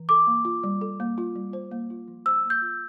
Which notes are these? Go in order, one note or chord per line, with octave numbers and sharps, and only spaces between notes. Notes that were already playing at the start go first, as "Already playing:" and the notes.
Already playing: E3
A4 D6
A#3
F4
G3
A4
A#3
F4
G3
C5
A#3
F4
F3
C5 E6
A#3
G6
F4